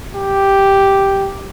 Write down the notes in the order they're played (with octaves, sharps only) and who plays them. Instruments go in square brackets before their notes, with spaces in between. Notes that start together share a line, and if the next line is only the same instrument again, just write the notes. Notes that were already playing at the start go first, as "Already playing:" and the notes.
[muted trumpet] G4